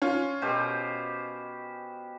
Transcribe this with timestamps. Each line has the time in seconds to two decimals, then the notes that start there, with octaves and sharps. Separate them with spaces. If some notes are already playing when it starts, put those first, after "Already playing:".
0.02 C#4 F4
0.42 B2 G4 C5